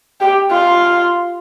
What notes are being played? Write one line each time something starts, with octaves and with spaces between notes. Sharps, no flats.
G4
F4